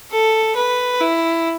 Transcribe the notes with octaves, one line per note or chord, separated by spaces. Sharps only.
A4
B4
E4